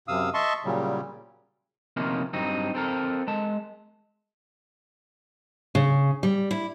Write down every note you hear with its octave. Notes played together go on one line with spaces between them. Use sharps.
F#2 C3 F5 D#6 E6
D#5 E5 A5 C6 C#6
A#2 C#3 F#3 G3
C3 F3 A#3 C#4 D#4
G2 F#3 C4 D#4
C4 A4 A#4
G#3 A5
C#3
G3
E4